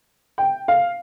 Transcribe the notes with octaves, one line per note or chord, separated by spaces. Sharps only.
G5
F5